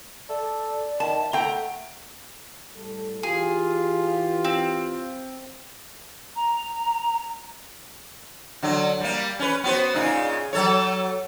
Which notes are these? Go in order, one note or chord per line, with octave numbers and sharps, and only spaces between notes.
A4 D5
D#3 A5
E5
A3 F#5 G5 A#5
A2 G3 A4
E3 F4 G4 G#4
C4
A#5
D3 F#3
G3 A#3
C#4 B4
B3 F#4 C5
A#2 C#3 D#4
F#3 A4 C#5